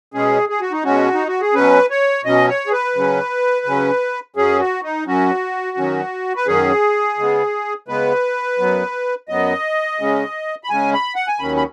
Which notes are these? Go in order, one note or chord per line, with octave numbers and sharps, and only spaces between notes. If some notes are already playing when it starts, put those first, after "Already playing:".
B2 G#3 C#4 G#4
G#4
F#4
D#4
B2 G#3 C#4 F#4
D#4
F#4
G#4
B2 F#3 C#4 B4
C#5
B2 F#3 C#4 D#5
C#5
G#4
B4
C#3 F#3 C#4
C#3 F#3 C#4
F#2 F#3 C#4 G#4
F#4
D#4
F#2 F#3 C#4 F#4
F#2 D#3 F#3 C#4
B4
F#2 D#3 F#3 C#4 G#4
C#3 G#3 B3
C#3 G#3 B3 B4
F#2 F#3 B3
F#2 F#3 B3 D#5
C#3 G#3 C#4
B5
C#3 G#3 C#4 G#5
B5
F#5
G#5
D#2 D#3 F#3 C#4 B5
B5